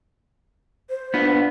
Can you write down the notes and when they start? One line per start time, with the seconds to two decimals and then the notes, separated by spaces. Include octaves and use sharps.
0.90 C5
1.14 B3 D4 F4